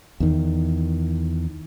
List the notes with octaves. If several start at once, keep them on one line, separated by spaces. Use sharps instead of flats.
E2 D#3